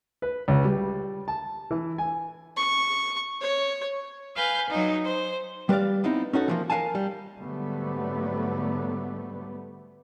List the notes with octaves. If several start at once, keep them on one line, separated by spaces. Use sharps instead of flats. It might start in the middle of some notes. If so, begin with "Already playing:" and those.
B4
C#2
G3
A5
E3
G#5
C#6
C#5
B4 F5 G#5 G6
F#3 D#4
C5
G3 B4 C#5 D5 F5
B3 C4 D#4 E4
C#4 D#4 F#4 A4
E3 F3 A#3
A#4 B4 F5 G#5 A5
G3
G#2 D3 F#3 G3 A3 B3